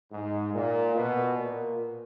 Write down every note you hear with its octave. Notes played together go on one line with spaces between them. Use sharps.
G#2
A#2
B2
A#2